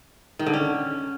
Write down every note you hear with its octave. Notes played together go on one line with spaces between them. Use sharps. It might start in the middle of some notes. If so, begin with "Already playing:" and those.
D#3
D3
C#4